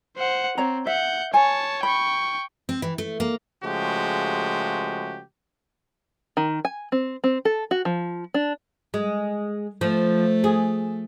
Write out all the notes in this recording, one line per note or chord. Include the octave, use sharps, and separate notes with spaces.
C5 F#5
C4 C#5 A#5
E5 F#5 G6
C#5 G#5 A5
G5 B5 C#6
C4
E3
A3
A#3
C#3 F3 G#3 A3 F#4 G4
D#3
G#5
C4
C4
A4
F#4
F3
D4
G#3
F3 A3
G#4